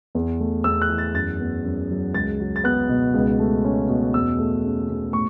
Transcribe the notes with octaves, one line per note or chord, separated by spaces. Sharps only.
E2
A3
E2 E6
F#6
E3
A6
F#2 A6
B3
F#2
F#3
C#2 A6
F#3
A6
B3 F#6
B2
C#2
A3
C#4
B2
E2 E6
A3
C#4
B2
A2 C#6